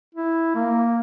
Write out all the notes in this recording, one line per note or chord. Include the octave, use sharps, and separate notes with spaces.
E4
A#3